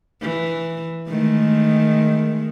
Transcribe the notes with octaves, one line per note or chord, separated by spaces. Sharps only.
E3
D#3 G#3 A3